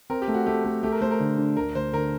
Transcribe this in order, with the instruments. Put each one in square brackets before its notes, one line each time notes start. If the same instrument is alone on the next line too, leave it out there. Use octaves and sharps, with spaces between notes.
[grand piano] C4 [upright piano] A#4
[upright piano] G4
[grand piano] A3
[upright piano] F#4
[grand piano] A3 [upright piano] G4
[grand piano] A3
[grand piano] A3 [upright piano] G4
[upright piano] A#4
[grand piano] A3 [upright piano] C5
[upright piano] A#4
[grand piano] D3
D4
[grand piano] D2 [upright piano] A#4
[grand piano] D2 [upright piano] C5
[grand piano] D3 [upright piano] A#4